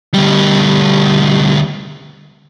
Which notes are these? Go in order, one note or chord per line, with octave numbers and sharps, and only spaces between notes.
D2 G3